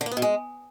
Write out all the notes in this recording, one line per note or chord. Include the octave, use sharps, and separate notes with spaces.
D3
A#3
B3
B2
G#3